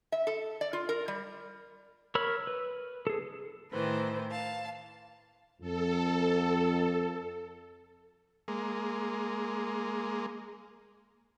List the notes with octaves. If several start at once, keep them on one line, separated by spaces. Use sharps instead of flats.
E5
A4
D5
F4
A#4
G3
A#4 C#5 B5 E6 F6
B4
G#4 A4
A2 D#3 E3 B4 C5
F5 A5
F2 A4
G#3 A#3